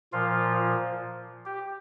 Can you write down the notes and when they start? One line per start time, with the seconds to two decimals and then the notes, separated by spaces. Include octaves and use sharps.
0.12 A#2 F3 F4
1.45 G4